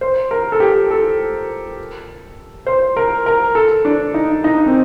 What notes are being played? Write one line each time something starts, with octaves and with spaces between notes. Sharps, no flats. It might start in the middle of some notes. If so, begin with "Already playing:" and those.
C5
A#4
A4
G4
A4
C5
A#4
A#4
A4
D4
D#4
D#4
C4